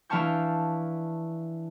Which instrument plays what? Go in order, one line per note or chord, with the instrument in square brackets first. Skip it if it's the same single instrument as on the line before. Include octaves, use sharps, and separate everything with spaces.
[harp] E3 D4 F5 A5 C#6 G6